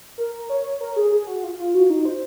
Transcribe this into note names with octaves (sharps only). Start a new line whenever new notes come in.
A#4
C#5
A#4
G#4
G#4
F#4
F4
F4
F#4
D#4
C5